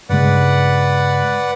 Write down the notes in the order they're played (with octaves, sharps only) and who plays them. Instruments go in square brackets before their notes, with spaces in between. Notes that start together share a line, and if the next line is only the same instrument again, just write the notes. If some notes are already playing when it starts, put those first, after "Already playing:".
[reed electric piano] G2 C#3 G#3 [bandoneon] B4 D5 F#5